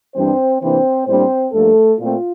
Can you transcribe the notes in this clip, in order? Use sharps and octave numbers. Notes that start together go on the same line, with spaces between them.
G2 E3 G3 C4 D4 C5
C3 E3 A#3 C4 D4 C5
A2 G3 A#3 C4 D4 C5
G2 F3 A3 A#3 A4
A#2 A3 C4 F4